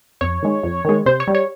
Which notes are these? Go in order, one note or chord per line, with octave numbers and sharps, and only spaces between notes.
F2 C#5
D#3 G#3
F2
D#3 G#3
C3 C5
C#5
G3
C#5